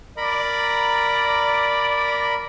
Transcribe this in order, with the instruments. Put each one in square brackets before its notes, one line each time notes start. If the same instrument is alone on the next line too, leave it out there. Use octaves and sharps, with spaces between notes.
[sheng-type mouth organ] A#4 A#5 B5 [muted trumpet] D5